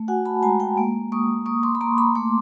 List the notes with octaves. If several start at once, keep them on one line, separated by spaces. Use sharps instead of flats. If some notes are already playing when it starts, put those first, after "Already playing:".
Already playing: A3
F#4 F#5 G#5
A5 B5
G#3 G#5 A#5
G5 A5
A#3
A#3 C#6 D#6
A#3 C#6 D#6
C6 D6
B5
A#3 A#5 C6
B5 C#6
A3 C6 D6